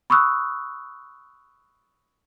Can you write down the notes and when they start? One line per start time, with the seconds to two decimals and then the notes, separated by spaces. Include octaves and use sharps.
0.10 B5 C#6 D#6 E6 F#6